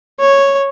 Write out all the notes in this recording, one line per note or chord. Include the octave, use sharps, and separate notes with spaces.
C#5